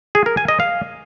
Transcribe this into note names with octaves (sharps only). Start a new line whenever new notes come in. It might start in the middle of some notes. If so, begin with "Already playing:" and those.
G#4
A#4
G#5
D#5
F5